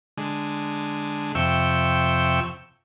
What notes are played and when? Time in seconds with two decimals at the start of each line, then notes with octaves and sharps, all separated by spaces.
0.17 D3 G#3
1.35 F2 C3 E5 G5 C#6 E6